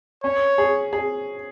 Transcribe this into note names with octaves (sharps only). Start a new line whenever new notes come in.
C#4 C#5
G#4
G#4